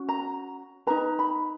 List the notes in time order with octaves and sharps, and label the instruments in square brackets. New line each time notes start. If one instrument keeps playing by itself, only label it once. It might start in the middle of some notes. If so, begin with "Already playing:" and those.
Already playing: [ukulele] C#4 F#4
A#5
D#4 G#4 B4 A#5
B5